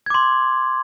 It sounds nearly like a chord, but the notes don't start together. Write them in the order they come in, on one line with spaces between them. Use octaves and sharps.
G#6 D6 C6